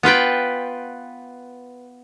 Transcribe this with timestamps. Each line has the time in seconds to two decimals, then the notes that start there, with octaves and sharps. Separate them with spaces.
0.03 B3 F4 B4 G5